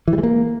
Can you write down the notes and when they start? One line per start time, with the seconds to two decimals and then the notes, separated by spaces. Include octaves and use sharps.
0.08 E3
0.13 G3
0.18 G#3
0.23 A#3